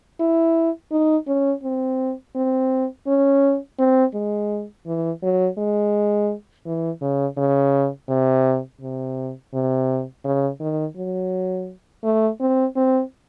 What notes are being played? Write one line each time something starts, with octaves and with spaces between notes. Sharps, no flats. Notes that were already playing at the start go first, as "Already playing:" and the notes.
E4
D#4
C#4
C4
C4
C#4
C4
G#3
E3
F#3
G#3
E3
C#3
C#3
C3
C3
C3
C#3
D#3
F#3
A3
C4
C4